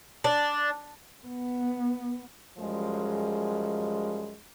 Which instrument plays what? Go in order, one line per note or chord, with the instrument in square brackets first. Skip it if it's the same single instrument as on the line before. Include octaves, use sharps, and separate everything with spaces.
[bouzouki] D4
[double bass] B3
[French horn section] F#2 F3 G3 G#3